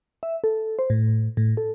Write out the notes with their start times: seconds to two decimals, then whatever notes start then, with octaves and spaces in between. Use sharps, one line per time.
0.23 E5
0.44 A4
0.79 C5
0.90 A2
1.37 A2
1.57 A4